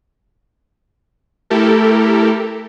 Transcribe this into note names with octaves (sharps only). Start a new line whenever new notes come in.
A3 E4 G4 A4 A#4